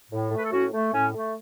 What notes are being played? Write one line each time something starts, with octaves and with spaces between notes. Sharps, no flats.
A2
A3 B4
A4
A2 C#4 F#4
A3
A2 C#4
A3